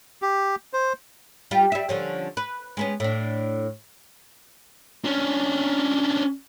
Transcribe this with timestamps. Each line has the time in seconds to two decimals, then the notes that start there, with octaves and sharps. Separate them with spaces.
0.22 G4
0.73 C5
1.51 G3 F4 G4
1.72 G3 E5
1.89 D3 F3 C#4
2.37 B4
2.77 G#3 B3 C#4
3.00 A2 D4
5.05 C#4 D4